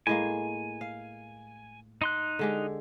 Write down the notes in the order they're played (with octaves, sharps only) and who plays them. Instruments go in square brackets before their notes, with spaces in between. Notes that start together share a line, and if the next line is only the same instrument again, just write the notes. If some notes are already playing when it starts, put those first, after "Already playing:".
[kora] A2 G#3 A#3 [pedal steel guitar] G#5
[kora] F5
[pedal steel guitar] D#4 C6 F#6
[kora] D3 G#3 G4